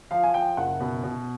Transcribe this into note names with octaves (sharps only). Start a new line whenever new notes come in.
F3 F5
G#5
F3 G5
F#1 F#5
B2
B2